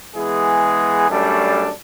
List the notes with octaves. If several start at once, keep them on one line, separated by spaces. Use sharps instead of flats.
E3 G#3 B3 G#4
F#2 G3 A3 D4